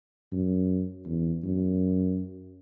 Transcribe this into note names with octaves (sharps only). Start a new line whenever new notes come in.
F#2
E2
F#2